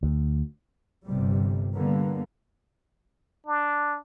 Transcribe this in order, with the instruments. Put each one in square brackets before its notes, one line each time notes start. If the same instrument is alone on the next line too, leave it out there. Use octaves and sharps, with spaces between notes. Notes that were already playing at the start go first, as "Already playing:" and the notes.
[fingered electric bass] D2
[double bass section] G1 C3 G3
D3 G3 A#3 B3
[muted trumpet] D4